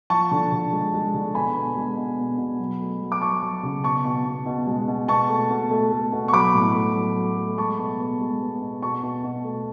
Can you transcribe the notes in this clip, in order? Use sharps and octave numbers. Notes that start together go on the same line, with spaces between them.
F3 A5 C#6
D3
D3
G#3
G#3
D3
B2 G#5 B5
B3
G#3
B2
B3
B2
F#3
A3
F#3
D6
F#3 A5 C#6
F#3
C#3
B2 A5 C#6
B2
B2
B2
G#3
B2
B2 A5 C#6
A3
B2
A3
A3
B2
C#6
F#3 B5 D6
A2
A3
F#3
F#3
A3
G#3 A5 C#6
B2
B3
G#3
B3
B2
B2 A5 C#6
B2
B2
A3